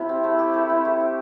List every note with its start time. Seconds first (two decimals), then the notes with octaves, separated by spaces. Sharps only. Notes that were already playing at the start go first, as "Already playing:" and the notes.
Already playing: C3 E4
0.09 C4
0.24 A3
0.39 G4
0.54 A3
0.70 C4
0.85 A3
1.00 G4